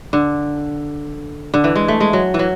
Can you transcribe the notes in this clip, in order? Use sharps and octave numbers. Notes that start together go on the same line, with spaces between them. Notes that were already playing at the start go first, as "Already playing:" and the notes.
D3
D3
E3
G#3
A3
G#3
F#3
E3
F#3